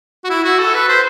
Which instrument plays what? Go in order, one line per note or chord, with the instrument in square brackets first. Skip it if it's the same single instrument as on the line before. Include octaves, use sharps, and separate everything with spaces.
[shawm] F#4
E4
F#4
A4
B4
C5